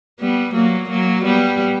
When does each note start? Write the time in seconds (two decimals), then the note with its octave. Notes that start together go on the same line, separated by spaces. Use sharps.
0.20 G3 B3
0.54 F#3 A#3
0.90 F#3 A#3
1.25 G3 B3